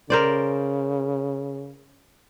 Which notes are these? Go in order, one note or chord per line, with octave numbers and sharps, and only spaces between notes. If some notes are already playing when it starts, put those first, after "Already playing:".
C#3 A#4 C5 D5